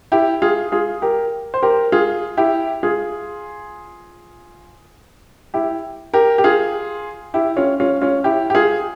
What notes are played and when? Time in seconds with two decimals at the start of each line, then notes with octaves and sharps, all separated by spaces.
0.12 E4 G4
0.42 F4 G#4
0.72 F4 G#4
1.02 G4 A#4
1.54 C5
1.63 G4 A#4
1.92 F4 G#4
2.37 E4 G4
2.83 F4 G#4
5.54 E4 G4
6.14 G4 A#4
6.38 G4
6.44 F4 G#4
7.34 E4 G4
7.57 C#4 F4
7.80 C#4 F4
8.02 C#4 F4
8.24 E4 G4
8.50 G4
8.55 F4 G#4